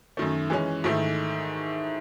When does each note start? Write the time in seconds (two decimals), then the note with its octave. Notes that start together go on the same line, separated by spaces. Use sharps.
0.17 F#2 D#3 A3
0.50 E3 G#3 C#4
0.84 G#2 D#3 A3 E4